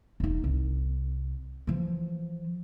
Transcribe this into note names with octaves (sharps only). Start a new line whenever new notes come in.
E1 D#4
C2
E3 F3